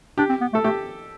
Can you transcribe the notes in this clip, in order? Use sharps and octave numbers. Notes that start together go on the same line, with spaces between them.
D4 G4
C4
B3
A3 A4
A3 G4